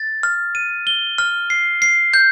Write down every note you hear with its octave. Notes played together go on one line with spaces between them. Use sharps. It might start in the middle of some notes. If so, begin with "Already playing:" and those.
Already playing: A6
F6
D#7
G7
F6
C7
C7
G6